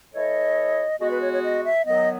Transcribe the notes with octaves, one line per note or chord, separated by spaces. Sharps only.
E3 A3 E4 A4 C#5 D#5
G#3 B3 F#4 D#5
B4
C#5
C#5
D#5
E5
D#3 F#3 B3 D#5